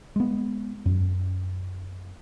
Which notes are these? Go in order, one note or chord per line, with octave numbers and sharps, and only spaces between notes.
G#3 B3
F#2